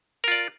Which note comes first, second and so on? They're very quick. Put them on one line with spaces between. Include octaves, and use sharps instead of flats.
A#4 F4 D5